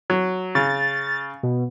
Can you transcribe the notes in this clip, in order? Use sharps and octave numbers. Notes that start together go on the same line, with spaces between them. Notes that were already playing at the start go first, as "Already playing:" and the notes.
F#3
C#3 A6
B2